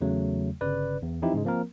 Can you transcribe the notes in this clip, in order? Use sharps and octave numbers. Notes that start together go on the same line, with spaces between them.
E2 C#3 F#3 A3
G1 C#3 B4 D5
E2
E3 F3 C4 D#4 E4 G4
G#2 C#3 G#3
F3 A#3 C4 A#4